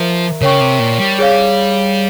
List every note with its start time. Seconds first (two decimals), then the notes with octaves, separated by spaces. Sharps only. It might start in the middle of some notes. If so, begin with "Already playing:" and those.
Already playing: F3 A#4 E5 A#5 C#6
0.41 C#3 A#4 C#5 G5 C#6
0.61 C3
0.80 A#2
1.00 G3
1.19 G#4 C#5 F5